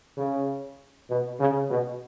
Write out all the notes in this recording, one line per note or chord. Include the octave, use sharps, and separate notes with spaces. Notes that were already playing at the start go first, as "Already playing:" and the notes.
C#3
B2
C#3
B2